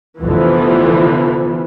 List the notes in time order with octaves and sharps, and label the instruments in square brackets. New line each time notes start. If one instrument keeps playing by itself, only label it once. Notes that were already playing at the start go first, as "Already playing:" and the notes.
[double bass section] F1 D3 [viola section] E3 F3 B3